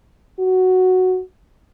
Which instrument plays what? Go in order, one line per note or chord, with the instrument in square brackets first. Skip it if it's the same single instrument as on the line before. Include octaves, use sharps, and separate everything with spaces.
[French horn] F#4